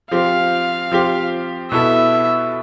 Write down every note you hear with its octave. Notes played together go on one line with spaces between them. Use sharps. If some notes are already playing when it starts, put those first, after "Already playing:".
F3 C4 G4 F5
F3 C4 G4
B2 B3 E4 A4 E5